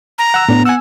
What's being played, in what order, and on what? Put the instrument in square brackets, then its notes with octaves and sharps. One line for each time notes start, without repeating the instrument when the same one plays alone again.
[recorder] A#5
[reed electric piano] F#5 E6 F#6
[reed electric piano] A2 D4 [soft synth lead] B3
[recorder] F#5 [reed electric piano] G#5 E6